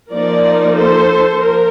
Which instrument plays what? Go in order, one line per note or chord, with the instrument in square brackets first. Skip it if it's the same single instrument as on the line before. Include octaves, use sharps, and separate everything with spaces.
[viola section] F3 A#3 D#4 A#4 D5
A4 C5
F3 A#4